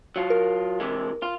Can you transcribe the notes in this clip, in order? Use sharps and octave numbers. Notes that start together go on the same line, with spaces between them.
F#3 F4
A#4
C3 E3 G#3
F4